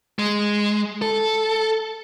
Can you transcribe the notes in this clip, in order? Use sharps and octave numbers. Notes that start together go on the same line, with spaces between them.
G#3
A4